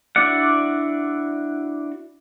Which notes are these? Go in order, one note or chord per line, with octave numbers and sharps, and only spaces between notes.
D4 E4 F#4 D5 F#5